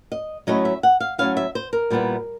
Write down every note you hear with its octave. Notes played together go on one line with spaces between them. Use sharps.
D#5
F#3 A3 C#4 E4 D#5
E5
F#5
F5
F#3 A3 C#4 E4 F5
E5
C5
A#4
A#2 G3 B3 E4